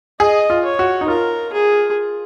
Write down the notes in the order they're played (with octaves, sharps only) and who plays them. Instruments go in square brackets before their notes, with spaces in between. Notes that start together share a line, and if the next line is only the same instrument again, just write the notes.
[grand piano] G#4 [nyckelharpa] D#5
[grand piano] F4
[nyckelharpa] C#5
[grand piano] F#4
D#4
[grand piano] F4 [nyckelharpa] A#4
[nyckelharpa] G#4